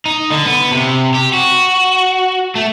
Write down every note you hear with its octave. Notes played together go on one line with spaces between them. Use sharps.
D#4
D3
B3
C3
G4
F#4
A3